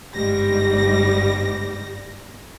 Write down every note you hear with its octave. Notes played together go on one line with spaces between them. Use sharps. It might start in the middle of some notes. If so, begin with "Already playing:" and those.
G1 G#2 G3 A#6